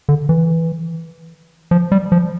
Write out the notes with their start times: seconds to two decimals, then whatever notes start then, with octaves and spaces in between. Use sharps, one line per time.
0.09 D3
0.29 E3
1.71 F3
1.92 G3
2.12 F3